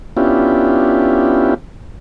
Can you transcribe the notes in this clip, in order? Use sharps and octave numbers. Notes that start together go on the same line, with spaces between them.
B3 C#4 D4 E4 F4 G4